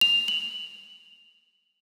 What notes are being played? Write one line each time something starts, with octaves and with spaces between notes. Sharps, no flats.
F7
F#7